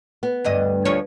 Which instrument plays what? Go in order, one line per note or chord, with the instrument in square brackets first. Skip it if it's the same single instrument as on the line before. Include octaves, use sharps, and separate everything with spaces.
[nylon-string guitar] B3
[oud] D2 G2 D#5
D2 F3 C#5